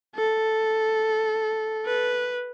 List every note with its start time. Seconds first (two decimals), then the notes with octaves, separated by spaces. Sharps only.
0.15 A4
1.86 B4